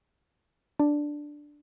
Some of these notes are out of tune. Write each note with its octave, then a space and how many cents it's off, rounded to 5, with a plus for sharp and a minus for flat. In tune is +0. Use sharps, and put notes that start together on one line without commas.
D4 +0